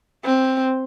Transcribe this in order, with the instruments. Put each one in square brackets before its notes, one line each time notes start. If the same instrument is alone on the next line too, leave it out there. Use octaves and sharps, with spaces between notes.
[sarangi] C4